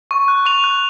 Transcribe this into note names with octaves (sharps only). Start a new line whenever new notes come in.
C#6
F#6
C#6 F7
F#6